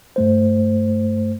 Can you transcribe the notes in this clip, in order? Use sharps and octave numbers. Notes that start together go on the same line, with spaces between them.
G2 A3 C5